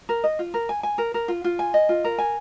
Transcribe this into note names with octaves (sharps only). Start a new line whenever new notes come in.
A#4
D#5
F4
A#4
G#5
G#5
A#4
A#4
F4
F4
G#5
D#5
F4
A#4
G#5